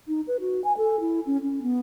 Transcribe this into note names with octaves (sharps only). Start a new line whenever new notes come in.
D#4
B4
F#4
G#5
A4
E4
C#4
C#4
B3